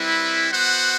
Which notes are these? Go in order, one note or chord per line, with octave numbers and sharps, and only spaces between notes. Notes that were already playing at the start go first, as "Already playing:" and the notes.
Already playing: G3 C4 E4 B4
B3 F#4 C5 F#5